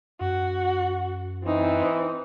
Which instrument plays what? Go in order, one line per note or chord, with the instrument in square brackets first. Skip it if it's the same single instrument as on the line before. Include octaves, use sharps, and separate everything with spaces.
[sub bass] F#2 [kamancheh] F#4
[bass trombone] E3 [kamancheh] C4 D#4